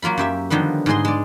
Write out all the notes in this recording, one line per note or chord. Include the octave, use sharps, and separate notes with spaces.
F#3 A#3 F4 B5
F#2 G4 E5
D3 D#3 F3 G3 B3
G#2 D3 B3 G#4 D#5 C6
G#3 D5